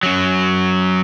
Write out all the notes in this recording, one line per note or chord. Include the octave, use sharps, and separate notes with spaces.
F#2 F#3